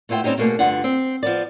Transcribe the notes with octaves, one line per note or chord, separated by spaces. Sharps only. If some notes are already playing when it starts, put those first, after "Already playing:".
A3 B3 E4 F4 G5
G3 C4 C#4 D#4 G4
B2 A3 A#3 G#4
D2 G2 D3 F4 F#5
C4
F3 B3 D5